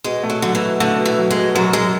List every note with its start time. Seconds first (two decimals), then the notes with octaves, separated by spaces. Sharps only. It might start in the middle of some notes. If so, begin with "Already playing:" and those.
0.04 B2 G#3
0.23 A3
0.30 F#3
0.42 D3 F#3
0.55 E3
0.61 B2
0.80 D3 A3
0.99 B2
1.05 E3
1.18 F#3
1.31 G#3
1.36 B2
1.55 F#2 F#3
1.73 F#2 G#3